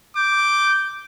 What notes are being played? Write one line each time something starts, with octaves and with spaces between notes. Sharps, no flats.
D6 G6